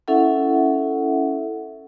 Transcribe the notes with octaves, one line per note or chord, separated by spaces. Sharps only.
C#4 E4 A4 E5 F#5